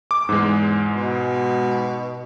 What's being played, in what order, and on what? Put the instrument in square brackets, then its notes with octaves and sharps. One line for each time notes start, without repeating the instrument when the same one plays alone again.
[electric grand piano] D6
[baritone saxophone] E2 [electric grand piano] G#2 G#3
[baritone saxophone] B2